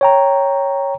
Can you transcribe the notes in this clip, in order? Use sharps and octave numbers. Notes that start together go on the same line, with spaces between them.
C#5 G5 A#5